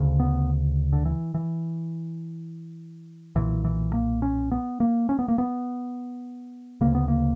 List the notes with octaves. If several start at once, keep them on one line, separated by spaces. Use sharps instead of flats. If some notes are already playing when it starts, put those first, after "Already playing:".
Already playing: D2 C#3
B3
D3
E3
E3
B1 A#2 E3
E3
A#3
C#4
B3
A#3
C#4
B3
A#3
B3
D2 C#3 A#3
B3
A#3